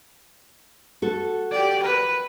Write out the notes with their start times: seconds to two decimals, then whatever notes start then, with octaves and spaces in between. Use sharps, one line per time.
1.02 F#4 A4
1.51 G4 D5
1.82 B4